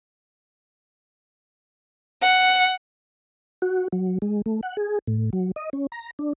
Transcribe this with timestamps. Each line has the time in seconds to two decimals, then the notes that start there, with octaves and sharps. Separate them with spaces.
2.22 F#5
3.62 F#4
3.92 F#3
4.22 G#3
4.46 A3
4.63 F#5
4.77 G#4
5.07 A2
5.33 F#3
5.56 D#5
5.73 C#4
5.92 A#5
6.19 D4